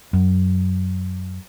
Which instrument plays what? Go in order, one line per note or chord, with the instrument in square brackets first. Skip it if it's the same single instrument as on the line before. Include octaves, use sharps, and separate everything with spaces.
[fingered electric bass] F#2